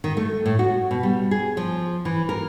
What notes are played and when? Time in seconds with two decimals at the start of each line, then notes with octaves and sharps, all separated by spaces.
0.04 D#3
0.17 A3
0.46 A2
0.59 F#4
0.91 B2
1.03 G3
1.31 G#4
1.57 F3
2.05 E3
2.29 A#4